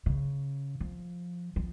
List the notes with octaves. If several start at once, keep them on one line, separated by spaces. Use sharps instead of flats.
C#3
F3
F3